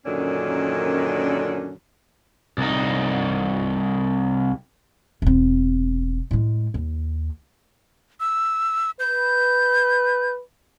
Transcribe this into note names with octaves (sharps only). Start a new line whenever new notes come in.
F#2 A#2 D3 D#3 C#4 D4
C2 D#4
E1 C4
A2 G#3
D#2
E6
B4 G6